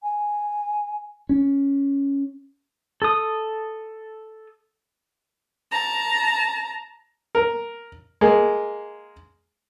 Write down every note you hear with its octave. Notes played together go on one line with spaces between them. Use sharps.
G#5
C#4
A4 D#6
A5 A#5
A#4
G#3 A#3